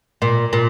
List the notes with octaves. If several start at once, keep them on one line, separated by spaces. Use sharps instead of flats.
A#2
A#2